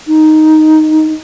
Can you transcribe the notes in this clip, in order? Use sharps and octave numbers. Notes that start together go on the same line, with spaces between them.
D#4